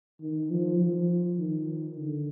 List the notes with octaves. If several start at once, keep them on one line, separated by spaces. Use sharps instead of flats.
D#3
F3
F3
D#3
D3